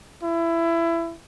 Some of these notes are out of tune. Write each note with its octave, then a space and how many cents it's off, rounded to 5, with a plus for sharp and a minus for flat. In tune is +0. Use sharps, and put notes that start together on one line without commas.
E4 +20